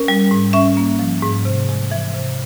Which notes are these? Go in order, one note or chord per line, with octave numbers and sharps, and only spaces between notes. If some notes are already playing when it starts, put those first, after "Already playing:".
Already playing: C#4 A#4
G3
G#2
C#4 E5
A#3
F3
G#2
C3
G#3
E3
C3